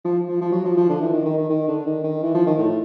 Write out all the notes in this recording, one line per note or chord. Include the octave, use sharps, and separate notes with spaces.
F3
F3
F3
F#3
F3
F3
D3
E3
D#3
D#3
D#3
D#3
D3
D#3
D#3
E3
F3
D#3
A2